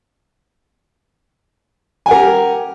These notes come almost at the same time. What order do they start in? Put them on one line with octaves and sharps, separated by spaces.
G#5 F#5 A#4 G4